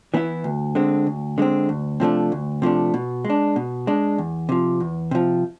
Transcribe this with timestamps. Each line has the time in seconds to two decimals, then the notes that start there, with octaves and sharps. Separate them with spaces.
0.14 E3 B3 E4
0.44 D2
0.75 D3 G#3 C4
1.07 D2
1.38 D3 G#3 C4
1.69 D2
2.00 C3 F3 A3 D4
2.32 D2
2.62 C3 F3 A3 D4
2.94 B2
3.25 G#3
3.30 D4
3.56 B2
3.87 G#3 D4
4.18 E2
4.49 C3 F3
4.80 E2
5.11 C3 F3